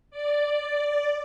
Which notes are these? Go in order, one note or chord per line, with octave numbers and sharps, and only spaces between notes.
D5